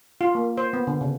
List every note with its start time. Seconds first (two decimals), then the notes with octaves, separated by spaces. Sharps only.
0.21 F4
0.35 A#3
0.58 C5
0.73 B3
0.87 D3
1.01 C#3